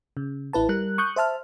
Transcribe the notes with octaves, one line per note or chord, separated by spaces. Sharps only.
C#3
A1 E4 B4 A5
G3 A#4 F#6
C#6 D#6 F#6 G6
C5 E5 A5 F6